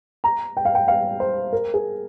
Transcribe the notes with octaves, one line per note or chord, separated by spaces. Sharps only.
A#5
G5
F5
G5
F5
C5
A#4
G#4